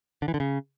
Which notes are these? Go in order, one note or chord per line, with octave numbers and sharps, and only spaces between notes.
D3
E3
D3
C#3